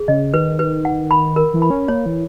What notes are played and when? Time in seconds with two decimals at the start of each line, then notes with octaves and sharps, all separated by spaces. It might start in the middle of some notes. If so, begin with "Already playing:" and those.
Already playing: G#4
0.08 C#3 D#5
0.34 D#3 B4
0.59 B4
0.85 F#5
1.11 B5
1.36 A#4
1.54 E3
1.62 B5
1.70 C#4
1.88 A#3 C#5
2.06 E3